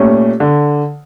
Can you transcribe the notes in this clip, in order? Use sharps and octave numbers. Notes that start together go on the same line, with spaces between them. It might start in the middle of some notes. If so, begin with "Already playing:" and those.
Already playing: A#2 A3 C#4 G4
D3